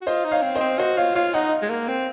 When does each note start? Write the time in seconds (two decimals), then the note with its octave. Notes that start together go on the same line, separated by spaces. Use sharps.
0.02 F#4
0.07 F4 C5 D#5
0.24 D#4
0.31 C#5 F5
0.42 C4
0.55 C5 D#5
0.61 C4
0.79 F#4 C5 D#5
0.97 F4 C#5 F5
1.15 F4 C#5 F5
1.34 D#4 D#5 F#5
1.62 G#3
1.70 A#3
1.88 C4